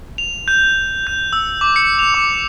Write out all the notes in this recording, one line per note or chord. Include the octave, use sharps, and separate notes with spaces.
F7
G6
G6
E6
D6
C#7
F7
D6